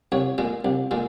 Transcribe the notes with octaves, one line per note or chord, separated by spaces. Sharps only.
C2 C#5
A#2 G#3
C2
A#2 G#3